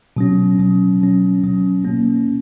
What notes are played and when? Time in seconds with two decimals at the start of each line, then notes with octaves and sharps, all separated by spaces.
0.17 B2 F#3 C#4
0.59 B2 F#3 C#4
1.02 B2 F#3 C#4
1.44 B2 F#3 C#4
1.85 B2 A#3 C#4